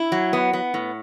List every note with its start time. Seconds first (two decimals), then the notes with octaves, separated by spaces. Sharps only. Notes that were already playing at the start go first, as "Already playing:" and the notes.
Already playing: E4
0.12 F#3
0.33 B3
0.53 B3
0.74 A2